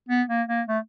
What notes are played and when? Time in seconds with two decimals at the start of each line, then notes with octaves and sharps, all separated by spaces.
0.09 B3
0.29 A#3
0.48 A#3
0.68 A3